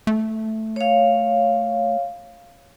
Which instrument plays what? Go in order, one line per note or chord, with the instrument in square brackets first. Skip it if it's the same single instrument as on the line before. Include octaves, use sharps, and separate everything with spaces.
[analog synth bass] A3
[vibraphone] C#5 F5